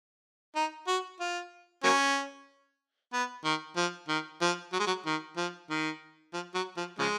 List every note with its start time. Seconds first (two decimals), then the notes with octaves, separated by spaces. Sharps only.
0.56 D#4
0.87 F#4
1.20 F4
1.84 F#3 A#3 C#4
3.13 B3
3.45 D#3
3.76 F3
4.08 D#3
4.41 F3
4.73 F#3
4.80 G#3
4.87 F#3
5.06 D#3
5.37 F3
5.70 D#3
6.34 F3
6.55 F#3
6.77 F3
6.99 C#3 F3 G#3